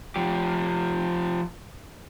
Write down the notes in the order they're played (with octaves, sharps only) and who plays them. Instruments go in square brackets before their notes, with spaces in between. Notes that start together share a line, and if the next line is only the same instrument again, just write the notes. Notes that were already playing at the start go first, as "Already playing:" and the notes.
[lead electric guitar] F3 G4